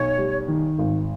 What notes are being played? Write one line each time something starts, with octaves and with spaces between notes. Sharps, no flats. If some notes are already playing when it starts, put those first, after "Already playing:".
Already playing: B1 C#5
G3
D#3
G#1